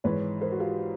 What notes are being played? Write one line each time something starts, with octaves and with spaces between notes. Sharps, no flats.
G#1 G#2 E3 B4 C#5
A#4 C5
F#4
F4 G4